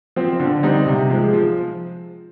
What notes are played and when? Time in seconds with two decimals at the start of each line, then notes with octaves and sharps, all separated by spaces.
0.16 F3 C4
0.40 D3
0.63 G3 C4 D#4
0.86 C3
1.10 F3 G#3
1.33 F3